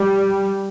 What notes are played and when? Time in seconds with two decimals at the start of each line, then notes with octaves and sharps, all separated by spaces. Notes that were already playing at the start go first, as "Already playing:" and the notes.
Already playing: G3